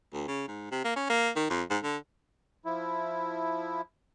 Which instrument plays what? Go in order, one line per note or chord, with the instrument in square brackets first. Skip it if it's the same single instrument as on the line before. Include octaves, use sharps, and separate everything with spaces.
[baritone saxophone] D2
C#3
G#2
C3
A#3
C#4
A#3
D#3
F2
G#2
D3
[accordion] F3 E4